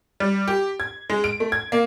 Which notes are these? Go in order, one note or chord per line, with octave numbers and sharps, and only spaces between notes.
G3
G4
G#6
G#3
D7
A3
G#6
A#3